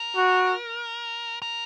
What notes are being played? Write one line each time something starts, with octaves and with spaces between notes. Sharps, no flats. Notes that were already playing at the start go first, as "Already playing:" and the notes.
Already playing: A#4
F#4
A#4